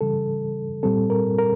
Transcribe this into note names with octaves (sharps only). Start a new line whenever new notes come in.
C#3 E3 G3 A4
A#2 G3 C4 A4
A#4
A#4